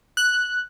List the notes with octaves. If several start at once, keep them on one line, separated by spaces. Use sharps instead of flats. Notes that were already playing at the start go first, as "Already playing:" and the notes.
F#6